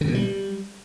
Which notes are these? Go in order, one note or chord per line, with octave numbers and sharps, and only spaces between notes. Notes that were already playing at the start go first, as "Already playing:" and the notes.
D3
B2
G3